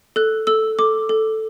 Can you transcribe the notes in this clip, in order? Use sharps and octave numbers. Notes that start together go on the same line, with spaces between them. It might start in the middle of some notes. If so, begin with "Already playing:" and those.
A4 F#6
A4 E6
A4 D6
A4